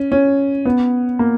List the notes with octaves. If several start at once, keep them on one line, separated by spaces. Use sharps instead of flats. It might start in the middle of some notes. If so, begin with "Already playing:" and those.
Already playing: C#4
C#4
B3
A#3